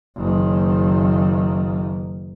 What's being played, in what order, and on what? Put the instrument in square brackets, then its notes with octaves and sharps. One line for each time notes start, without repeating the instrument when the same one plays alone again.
[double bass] F#1 D#3